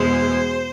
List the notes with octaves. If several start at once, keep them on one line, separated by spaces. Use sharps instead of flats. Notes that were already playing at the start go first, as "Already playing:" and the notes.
Already playing: E2 B2 G#3 C5